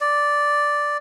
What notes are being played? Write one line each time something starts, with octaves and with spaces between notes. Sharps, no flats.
D5